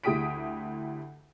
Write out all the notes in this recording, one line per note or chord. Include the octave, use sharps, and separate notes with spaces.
D2 E4 G4 D#6 B6 D7